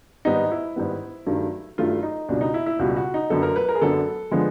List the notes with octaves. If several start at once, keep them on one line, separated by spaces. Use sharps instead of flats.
G#2 D#3 G3 B3 D#4
E4
G#2 D#3 G3 B3
G2 D#3 F#3 A3
G2 D#3 F#3 A3 F4
D#4
C#2 B2 G3 D4
D#4
E4
E4
C#2 B2 G3 F#4
F#4
D#4
F#2 D3 F#3 B3 A4
A#4
B4
A#4
G#4
F#2 D3 F#3 B3 A4
D3 F3 G#3 B3